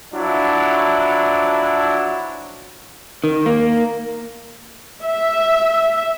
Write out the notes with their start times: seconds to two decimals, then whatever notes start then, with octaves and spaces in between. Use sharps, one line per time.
0.14 F3 F#3 D4 E4
3.24 D#3
3.46 A#3
5.04 E5